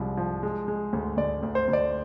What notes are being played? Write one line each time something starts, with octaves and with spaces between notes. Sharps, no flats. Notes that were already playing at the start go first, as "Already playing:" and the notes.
Already playing: C2 F3 G#3
F3
G#3
G#3
D2
D2 D5
D2
C5
D2
D5